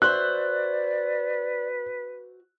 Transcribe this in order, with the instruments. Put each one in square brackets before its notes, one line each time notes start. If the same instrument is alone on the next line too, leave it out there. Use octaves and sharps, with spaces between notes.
[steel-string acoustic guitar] F#4 C5 E5 [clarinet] B4 [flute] D5 [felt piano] F#6